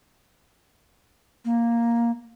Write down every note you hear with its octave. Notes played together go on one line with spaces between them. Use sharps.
A#3